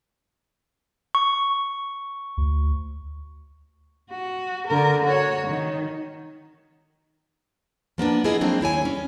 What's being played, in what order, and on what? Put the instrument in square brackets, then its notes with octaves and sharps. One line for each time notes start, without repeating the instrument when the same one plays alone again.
[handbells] C#6
[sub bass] D2
[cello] F#4
D3 A#4
F#4 C#5
D#3
[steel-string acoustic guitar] F3 A#3 B3 D4
E4 F4 G#4 D#5
F#3 A#3 C4 D4
D#2 E4 C#5 G#5
G3 C#4